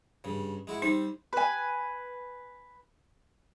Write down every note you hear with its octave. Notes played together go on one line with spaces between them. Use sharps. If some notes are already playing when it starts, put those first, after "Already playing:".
G2 C#3
G#3 E4 F#4
G3 C4 D#4 C5
B4 G#5